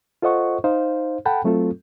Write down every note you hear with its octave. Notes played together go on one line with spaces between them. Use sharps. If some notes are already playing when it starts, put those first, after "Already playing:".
F4 A4 C5 D#5 F#5 C#6
D#4 C5 F5
A4 F#5 G5 A5 B5
F#3 A3 C4 F4 A4